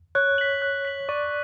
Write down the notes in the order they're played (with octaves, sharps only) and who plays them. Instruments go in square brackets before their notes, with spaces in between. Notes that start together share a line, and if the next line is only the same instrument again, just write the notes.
[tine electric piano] C#5 [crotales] F#6
[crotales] B6 F#7
F#6
B6 F#7
[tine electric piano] D5 [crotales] C#6